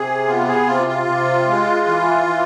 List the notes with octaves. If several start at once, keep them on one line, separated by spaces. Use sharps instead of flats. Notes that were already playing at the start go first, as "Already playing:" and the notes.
Already playing: C3 G#4
B3 F4
G#4
C3 F4
F4
C3
G#3
E3
E3